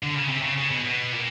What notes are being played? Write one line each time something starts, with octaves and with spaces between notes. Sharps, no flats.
D3
C#3
C3
C#3
C#3
B2
B2
A#2